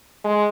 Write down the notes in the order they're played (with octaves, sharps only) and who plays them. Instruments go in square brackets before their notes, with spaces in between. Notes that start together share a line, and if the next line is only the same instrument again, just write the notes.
[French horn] G#3